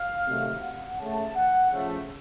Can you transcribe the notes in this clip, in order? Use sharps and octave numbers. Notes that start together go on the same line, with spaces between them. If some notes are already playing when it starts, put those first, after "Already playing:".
Already playing: F5
C3 D#3 F#3 A3
F#5
C#3 A3 A5
F#5
C#3 F3 A3